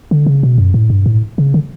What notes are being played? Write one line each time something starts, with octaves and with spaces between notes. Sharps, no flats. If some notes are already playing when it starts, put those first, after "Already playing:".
D3
C#3
B2
F#2
A2
G2
A2
C#3
D3